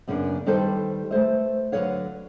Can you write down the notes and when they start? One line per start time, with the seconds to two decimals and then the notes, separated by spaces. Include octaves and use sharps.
0.08 F#2 C#3 A#3 B3 D4
0.46 D#3 G3 G4 A4 B4 C5
1.11 A3 B4 C5 E5
1.72 D3 F#3 G#4 B4 C#5 F5